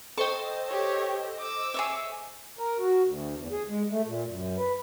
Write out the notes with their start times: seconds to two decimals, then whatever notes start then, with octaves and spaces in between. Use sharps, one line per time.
0.18 A4 C5 D#5 G5 C#6
0.69 G4 C#5
1.39 D6 E6
1.74 G#4 C#5 E5
2.59 A#4
2.79 F#4
3.05 D2
3.36 E2
3.51 G#4
3.69 G#3
3.90 A3
4.06 A#2
4.27 F#2
4.57 B4